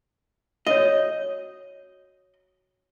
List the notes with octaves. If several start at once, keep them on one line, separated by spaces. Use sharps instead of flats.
F#4 C#5 D#5